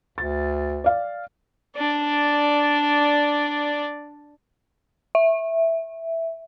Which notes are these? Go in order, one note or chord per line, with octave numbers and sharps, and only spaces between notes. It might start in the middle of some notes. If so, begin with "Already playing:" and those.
D2 A6
D5 F5
D4 D5
E5